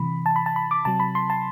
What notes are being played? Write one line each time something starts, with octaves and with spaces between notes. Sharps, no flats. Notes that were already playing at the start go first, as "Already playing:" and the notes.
Already playing: C3 E3 B5
A5
B5
A5
B5
D6
C3 F#3 A5
B5
C6
A5